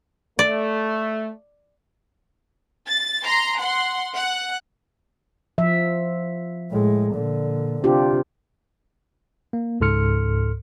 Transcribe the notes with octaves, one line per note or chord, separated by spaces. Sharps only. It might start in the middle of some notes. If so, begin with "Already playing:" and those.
A3 D5
A6
A#5 C6
F#5 C6
F#5
F3 E5
A2 G#3
A#2 D3
C3 D4 F4 G4
A#3
C#2 G#2 A4 C6 F6 C#7